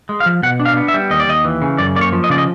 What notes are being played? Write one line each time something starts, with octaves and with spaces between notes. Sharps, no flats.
G#3
F5
F3
B2 F#5
D4
F5
B3
E5
G3
D#2 D#5
D5
D#2 D#5
E3
C#3
F#2 D5
A#3 D5
C#5
F3
D#5
C#3 D5
D#5